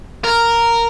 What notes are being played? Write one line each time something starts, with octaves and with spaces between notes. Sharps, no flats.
A#4